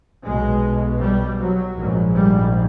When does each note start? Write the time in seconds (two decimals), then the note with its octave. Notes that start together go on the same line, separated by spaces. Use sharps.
0.25 B1 B2 G#3
1.01 G3
1.39 F#3
1.77 A#1 G#2
2.15 G3